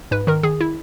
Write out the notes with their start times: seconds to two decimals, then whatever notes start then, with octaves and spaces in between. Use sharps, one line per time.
0.11 G#2 B4
0.27 D#3 A#4
0.43 D#3 G#4
0.61 E4